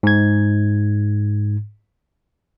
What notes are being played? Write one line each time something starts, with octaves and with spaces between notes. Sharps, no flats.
G#2 G#6